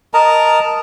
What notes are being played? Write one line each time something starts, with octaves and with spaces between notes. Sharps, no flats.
A#4 D#5 A5 A#5